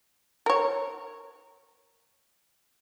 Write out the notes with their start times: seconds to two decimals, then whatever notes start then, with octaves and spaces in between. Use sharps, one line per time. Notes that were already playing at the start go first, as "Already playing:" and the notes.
0.46 A#4 C#5